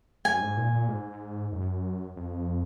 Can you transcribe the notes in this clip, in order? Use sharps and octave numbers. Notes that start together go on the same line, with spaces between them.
F#2 G#5
G#2
A#2
A#2
G#2
F#2
F2